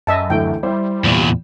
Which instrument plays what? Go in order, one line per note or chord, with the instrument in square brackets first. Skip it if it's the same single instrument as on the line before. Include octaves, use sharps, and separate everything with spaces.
[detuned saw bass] F#2 [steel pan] D#5 E5 A5
[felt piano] D2 E3 A3 [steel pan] G5
[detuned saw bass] G3 [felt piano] E4 C5
[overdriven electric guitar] E2 A#2